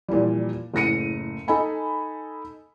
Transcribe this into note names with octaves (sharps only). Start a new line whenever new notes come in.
A#2 E3 F3 G3
F#1 A2 A#6 C#7 D#7
D#4 A4 D#5 G#5 B5